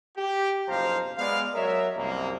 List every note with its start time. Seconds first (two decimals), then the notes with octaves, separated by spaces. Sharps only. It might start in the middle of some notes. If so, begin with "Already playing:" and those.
0.17 G4
0.68 F#1 B1 F3 C5 F5 A#5
1.18 G#3 B3 D5 F5
1.55 F#3 A#4 C#5 D#5 E5
1.97 C2 F#2 A#3